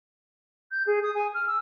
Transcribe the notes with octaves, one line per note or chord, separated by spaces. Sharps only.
G6
G#4
D#6
G#5
F6
E6